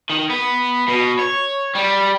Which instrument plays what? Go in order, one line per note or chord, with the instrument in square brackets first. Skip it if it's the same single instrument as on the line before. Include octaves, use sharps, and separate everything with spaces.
[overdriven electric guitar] D#3
B3
B2
C#5
G3